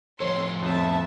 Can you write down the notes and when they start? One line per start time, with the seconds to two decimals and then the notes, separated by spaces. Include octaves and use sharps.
0.20 A2 F3 A4 C#5 C6
0.62 F2 E5 A5